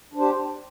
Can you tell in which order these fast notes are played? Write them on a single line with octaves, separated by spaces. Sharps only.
D4 C5 G4